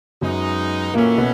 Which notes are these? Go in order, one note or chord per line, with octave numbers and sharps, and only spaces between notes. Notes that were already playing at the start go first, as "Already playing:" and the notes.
F#2 F#3 G#3 B3 D#4
A#2 E3 A3 A#3 C#4 F#4
B2 B3